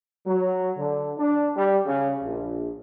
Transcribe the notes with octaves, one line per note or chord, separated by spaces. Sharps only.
F#3
D3
D4
G3
C#3
A#1